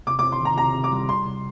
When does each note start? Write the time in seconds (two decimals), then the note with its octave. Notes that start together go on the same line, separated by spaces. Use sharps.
0.07 C3 D6
0.19 D6
0.23 C4
0.32 C6
0.41 D#3 A#5
0.58 C3 A#5
0.75 C3
0.84 D6
0.92 G3
1.09 G3 C6
1.25 C3